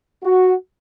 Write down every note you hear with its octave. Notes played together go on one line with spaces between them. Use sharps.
F#4